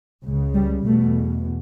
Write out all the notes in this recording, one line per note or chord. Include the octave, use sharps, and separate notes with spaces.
C#2 C#3
G3
E2 B2 A3